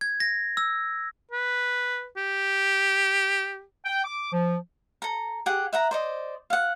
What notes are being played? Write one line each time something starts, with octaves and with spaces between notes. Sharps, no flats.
G#6
A#6
E6
B4
G4
G5
D6
F3
A4 A#5
G4 G#4 F#5
E5 F#5 A#5
C5 D5 D#5
F5 F#5